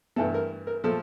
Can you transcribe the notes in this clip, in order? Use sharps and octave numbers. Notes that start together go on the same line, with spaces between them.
G2 E3 A3 A4
A#4
A#4
A#2 F3 A3 A4